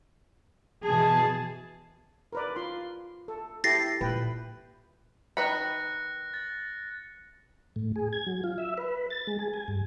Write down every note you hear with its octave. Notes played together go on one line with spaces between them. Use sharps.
B2 E3 G#4 A5
A#4 B4 D5
F4 C6
A4
E4 G4 A4 A6 A#6 C7
A#2 A#3 B4 G5
D#3 B4 B5 F#6 A#6 C#7
A6
A2
G#4
G#6
F#3
F4
E5
B4
A6
G#3
G#4
G#5
G2